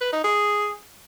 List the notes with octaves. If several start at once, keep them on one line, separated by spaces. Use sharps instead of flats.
B4
D#4
G#4